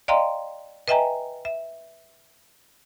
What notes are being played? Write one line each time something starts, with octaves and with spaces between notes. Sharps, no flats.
D5 D#5 F5 G5 A#5 C6
B4 D#5 E5 G5 G#5 A#5
E5